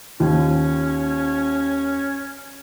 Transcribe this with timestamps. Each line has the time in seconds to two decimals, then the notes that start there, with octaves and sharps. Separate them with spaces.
0.20 D#2 D#3 F3 C#4